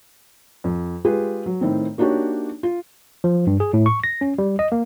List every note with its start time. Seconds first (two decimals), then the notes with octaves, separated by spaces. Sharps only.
0.64 F2
1.05 G#3 F4 G4 G#4 B4
1.46 F#3
1.61 A2 D#3 C4
1.98 A#3 D4 D#4 F#4 G4 C#5
2.63 F4
3.24 F3
3.47 G2
3.60 G#4
3.74 A2
3.86 C#6
4.04 A#6
4.21 C#4
4.38 G3
4.59 D#5
4.72 A#3